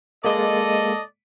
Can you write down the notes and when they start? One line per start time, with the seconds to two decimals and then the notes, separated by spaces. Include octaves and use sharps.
0.25 G#3 A#3 A4 D5 D#5